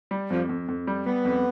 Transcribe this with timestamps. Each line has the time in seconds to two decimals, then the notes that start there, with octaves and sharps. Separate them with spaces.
0.11 G3
0.30 F2 F3
0.49 F2
0.68 F2
0.87 G3
1.06 G3 B3
1.25 F2